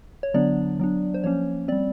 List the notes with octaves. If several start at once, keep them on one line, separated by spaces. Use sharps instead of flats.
C#5
D3 F#3 B3 D4 D5
F#3 B3 D4
C5
F3 A#3 C#4 C#5
G3 C4 D5